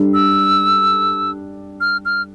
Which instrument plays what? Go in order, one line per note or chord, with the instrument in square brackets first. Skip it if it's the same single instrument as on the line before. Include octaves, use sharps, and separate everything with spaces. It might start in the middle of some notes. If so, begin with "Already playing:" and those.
Already playing: [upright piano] G3 D4 A4
[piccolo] E6
F6
F6